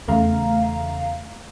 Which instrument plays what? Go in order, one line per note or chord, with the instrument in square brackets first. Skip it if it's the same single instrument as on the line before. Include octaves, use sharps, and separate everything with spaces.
[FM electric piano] E2 C#3 A3 F5 A#5